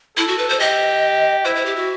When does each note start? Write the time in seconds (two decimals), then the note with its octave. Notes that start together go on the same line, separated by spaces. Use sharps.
0.17 E4 A4
0.28 F#4
0.38 B4
0.49 C5
0.60 G4 D#5
1.45 E4 C5
1.56 C5
1.66 G4
1.76 F#4